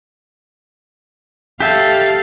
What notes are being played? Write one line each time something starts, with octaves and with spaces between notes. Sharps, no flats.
G4 A4 E5 F5